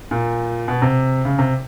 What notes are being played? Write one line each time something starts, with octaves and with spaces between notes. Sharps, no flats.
A#2
B2
C3
C#3
C3